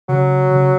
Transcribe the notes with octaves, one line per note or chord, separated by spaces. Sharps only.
C#3 F#3
C#3